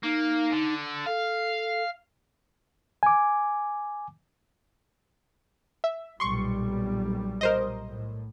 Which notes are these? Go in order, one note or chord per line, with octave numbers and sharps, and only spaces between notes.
A#3 D#4
D3
A4 F5
G#5 D6
E5
B1 A#2 G3 C6 C#6
A#4 C5 D#5
A2